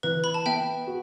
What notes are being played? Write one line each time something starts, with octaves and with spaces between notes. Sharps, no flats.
E3 B4
B5
A5
B3 E5 G5
F#4